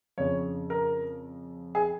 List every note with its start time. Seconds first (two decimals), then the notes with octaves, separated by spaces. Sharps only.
0.18 F2 C#3 C#5
0.70 A#4
1.75 G#4